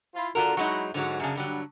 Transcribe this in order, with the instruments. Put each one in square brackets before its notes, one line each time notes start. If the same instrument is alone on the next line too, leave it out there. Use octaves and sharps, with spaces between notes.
[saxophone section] E4 F4
[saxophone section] D3 [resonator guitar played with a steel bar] F4 F#4 A#4
[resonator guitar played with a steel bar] F#3 G#3 D#4 [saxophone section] E4 F#4
[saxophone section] G#2 [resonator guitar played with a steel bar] D3 F#3 F#4
[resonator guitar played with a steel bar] F#2 C#3 [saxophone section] D4 F#4 G#4
[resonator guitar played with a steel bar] G2 D3 F#3 [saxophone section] G3